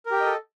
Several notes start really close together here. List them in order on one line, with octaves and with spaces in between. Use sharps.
A#4 G4 G5 D#5 A4